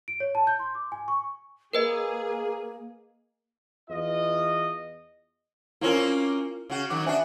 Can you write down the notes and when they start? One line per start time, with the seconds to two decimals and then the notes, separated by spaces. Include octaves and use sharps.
0.08 D7
0.20 C#5
0.35 A5
0.47 G6
0.59 C6
0.75 D6
0.92 G#5
1.08 C#6
1.73 A#3 G#4 A#4 B4 D#5
3.90 E2 F4 D#5
5.81 A#3 C4 C#4 E4 F4 A#4
6.70 C#3 F#4
6.90 D#3 F#3 F#4 D6
7.06 B3 D4 F#4 C5 E5 G#5